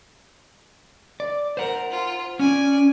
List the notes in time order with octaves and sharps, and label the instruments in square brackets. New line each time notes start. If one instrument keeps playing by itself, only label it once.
[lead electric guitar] D5
[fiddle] A#4 A#5 [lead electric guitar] C5 F#5
[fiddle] F4
[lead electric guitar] C#4 [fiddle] D5 G#5